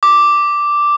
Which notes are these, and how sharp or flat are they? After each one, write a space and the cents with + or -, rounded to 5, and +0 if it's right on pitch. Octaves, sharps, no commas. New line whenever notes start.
D6 +0